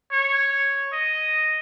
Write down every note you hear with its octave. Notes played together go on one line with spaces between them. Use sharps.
C#5
D#5